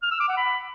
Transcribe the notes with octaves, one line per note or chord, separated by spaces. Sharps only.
F6
E6
D6
F#5
B5